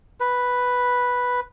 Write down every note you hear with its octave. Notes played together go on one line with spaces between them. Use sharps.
B4